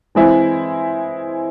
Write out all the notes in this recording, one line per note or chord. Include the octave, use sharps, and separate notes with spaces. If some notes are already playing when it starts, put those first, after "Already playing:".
E3 G#3 C4 E4